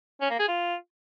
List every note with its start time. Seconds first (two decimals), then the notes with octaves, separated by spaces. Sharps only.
0.21 C#4
0.30 A#3
0.39 G#4
0.49 F4